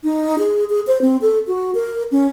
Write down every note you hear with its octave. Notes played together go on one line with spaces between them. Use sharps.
D#4
G#4
G#4
C5
C4
A4
F#4
A#4
C#4